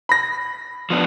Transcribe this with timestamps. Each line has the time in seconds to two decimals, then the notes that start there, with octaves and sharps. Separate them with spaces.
0.09 B5 A#6
0.90 F3 B3 D4